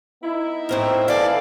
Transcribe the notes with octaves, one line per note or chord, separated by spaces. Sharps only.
B3 D#4 E4
A2 C4 A#4
E3 A4 D5 F5